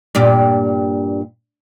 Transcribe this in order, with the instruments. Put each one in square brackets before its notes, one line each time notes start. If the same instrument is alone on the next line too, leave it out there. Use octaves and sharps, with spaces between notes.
[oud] G2 A#2 G4